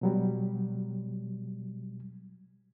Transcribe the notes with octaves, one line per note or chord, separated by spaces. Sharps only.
B2 F#3 G3